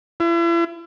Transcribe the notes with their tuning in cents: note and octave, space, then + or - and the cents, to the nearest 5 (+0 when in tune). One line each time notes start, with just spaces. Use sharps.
E4 +40